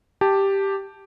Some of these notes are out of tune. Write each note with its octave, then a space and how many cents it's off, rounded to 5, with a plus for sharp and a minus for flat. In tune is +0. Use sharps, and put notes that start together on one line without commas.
G4 +0 A5 +0